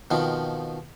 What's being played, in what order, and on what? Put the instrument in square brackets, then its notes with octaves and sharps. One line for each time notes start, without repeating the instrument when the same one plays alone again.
[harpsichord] B2 D#3 F3 C4